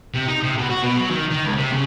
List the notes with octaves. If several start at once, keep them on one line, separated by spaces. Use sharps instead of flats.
C3
D#4
C3
B2
F#4
B2
F#3
D#3
D#3
C#2
C3
C#3